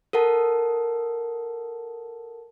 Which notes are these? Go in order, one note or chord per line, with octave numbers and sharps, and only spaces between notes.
A4 A#4 F#5 A5